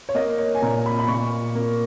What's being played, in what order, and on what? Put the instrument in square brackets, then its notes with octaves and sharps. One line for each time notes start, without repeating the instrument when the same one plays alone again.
[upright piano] C#5
A#3 D#5
C#5
G#5
A#2 A#5
B5
B5
A#2 C#6
A#3